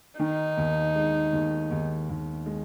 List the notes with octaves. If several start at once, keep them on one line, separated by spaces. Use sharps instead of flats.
D#3 D#4
D#2
G#3
D#2
D#2
D#2
G#3